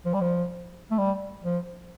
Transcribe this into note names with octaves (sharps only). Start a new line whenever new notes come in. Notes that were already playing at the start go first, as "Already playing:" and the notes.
F3
G3
F3
A3
G3
F3